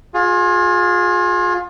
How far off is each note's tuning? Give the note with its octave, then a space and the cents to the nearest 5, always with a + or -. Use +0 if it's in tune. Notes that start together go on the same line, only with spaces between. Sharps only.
F4 +30 G#4 +0